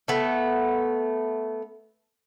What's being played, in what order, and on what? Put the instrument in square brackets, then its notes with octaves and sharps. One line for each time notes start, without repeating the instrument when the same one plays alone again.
[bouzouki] A3 B3